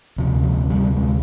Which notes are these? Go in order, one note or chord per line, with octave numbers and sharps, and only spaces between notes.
D2 C3 F3
F3
G3
G#3